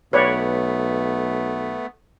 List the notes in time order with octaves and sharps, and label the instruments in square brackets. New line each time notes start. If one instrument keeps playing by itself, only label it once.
[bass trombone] B1 [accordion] A3 B3 [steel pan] B4 C#5 D5